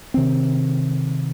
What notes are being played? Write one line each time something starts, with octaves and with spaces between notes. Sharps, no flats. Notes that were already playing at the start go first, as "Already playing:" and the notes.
C3 D#3 C4